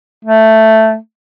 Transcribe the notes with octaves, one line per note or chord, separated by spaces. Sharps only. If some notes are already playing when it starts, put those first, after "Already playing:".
A3